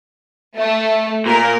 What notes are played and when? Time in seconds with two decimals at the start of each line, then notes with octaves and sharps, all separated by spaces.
0.57 A3
1.26 A#2 A#4